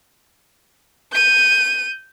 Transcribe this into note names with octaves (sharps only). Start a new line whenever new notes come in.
G6 D#7